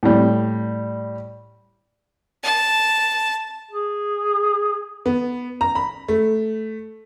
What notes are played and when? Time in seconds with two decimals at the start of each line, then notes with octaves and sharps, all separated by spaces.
0.03 A2 G3
2.44 A5
3.71 G#4
5.06 B3
5.61 A#5
5.75 B5
6.08 A3